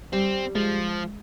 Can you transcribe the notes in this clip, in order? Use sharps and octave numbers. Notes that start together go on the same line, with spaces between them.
G3 C4
F3 G#3